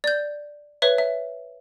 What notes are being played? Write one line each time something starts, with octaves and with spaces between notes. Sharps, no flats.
D5 G6
B4 C#5 E5
E5